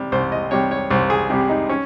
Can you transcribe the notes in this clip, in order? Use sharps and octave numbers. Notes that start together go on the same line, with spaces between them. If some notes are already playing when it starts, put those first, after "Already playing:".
Already playing: C3 G3
C2 C5
D#5
C3 G3 C#5
C#5
C2 C5
G#4
C3 G3 G4
D#4
C#4